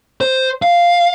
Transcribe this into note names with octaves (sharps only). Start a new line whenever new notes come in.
C5
F5